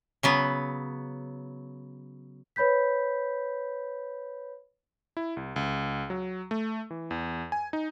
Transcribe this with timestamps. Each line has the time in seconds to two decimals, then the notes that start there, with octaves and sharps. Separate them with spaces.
0.23 C#3 F#3 B3
2.56 B4 C#5 B5 G6 B6
5.17 E4
5.37 C2
5.56 C#2
6.10 F#3
6.51 A3
6.90 E3
7.11 E2
7.52 G#5
7.73 D#4